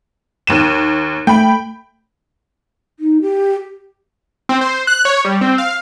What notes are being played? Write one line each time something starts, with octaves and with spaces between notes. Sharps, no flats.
D#2 D#7 E7
A3 G5 B5
D#4
G4
C4
C5
F#6
C#5
G3
C4
F5